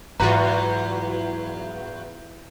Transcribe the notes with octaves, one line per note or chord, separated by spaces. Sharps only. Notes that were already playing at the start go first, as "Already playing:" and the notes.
E2 G#2 F#3 F4 F#4 B4 A#5